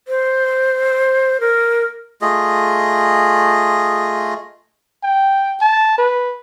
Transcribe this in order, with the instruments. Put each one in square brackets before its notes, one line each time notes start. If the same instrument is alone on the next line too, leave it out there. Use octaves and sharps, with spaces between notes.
[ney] C5
A#4
[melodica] A3 F4 G#4 D#5
[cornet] G5
A5
B4